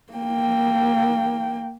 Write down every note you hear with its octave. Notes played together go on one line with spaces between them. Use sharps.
A#3 G5